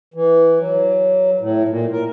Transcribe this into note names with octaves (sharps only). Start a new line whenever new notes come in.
E3
F#3
A2
A#2
A#4